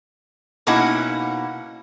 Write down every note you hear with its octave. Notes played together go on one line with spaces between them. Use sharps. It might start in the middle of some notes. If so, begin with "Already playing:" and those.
B2 A#3 C#4 D#4 E4 F#5